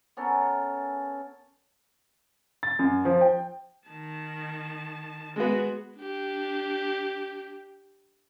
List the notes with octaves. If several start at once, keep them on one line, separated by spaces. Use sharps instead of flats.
B3 C#4 A4 A#4
A6
F#2
F3
G5
D#3 A5
G#3 B3 F#4
D4 G4